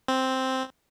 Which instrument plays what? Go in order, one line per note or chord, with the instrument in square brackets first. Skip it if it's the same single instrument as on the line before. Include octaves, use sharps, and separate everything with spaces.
[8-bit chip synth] C4